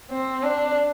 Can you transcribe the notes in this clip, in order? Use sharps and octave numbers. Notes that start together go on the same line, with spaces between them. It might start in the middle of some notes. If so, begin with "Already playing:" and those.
C4
D4